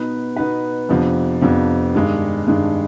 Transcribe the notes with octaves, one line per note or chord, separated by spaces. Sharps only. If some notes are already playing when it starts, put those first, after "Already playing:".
Already playing: B2 B3 D#4 B4
B2 B3 D#4 B4
F2 C3 F3 B3 D4
F2 C3 F3 B3 D4
G2 D#3 G#3 D4
G2 D#3 G#3 D4